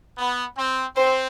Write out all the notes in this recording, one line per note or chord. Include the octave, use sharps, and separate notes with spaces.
B3
C4
C4 C5